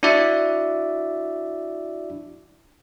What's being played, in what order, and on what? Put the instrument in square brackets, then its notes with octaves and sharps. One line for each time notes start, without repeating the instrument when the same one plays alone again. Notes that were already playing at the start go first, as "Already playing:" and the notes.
[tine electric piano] D4 E4 F#4 D5 E5